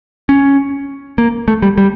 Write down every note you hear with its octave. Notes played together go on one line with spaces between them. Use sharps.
C#4
A#3
A3
G3
G3